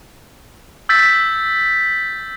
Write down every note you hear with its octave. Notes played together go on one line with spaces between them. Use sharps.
E6 G6 A6 B6